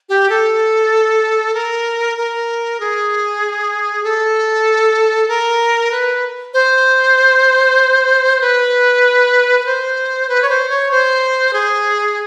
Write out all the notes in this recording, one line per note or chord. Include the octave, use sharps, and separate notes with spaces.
G4
A4
A#4
A#4
G#4
A4
A#4
B4
C5
B4
B4
C5
B4
C#5
C5
C#5
C5
G#4